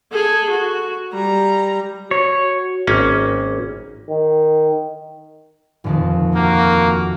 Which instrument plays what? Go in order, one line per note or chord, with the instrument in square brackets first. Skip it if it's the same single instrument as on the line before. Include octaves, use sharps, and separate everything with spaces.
[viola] G#4 A4
F#4
G3 A#5
[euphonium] F#4 [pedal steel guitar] C#5
[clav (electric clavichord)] G#1 A#3 C#4
[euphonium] D#3
[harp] D#1 F2 D#3
[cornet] A#3 [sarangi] F#4 [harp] G6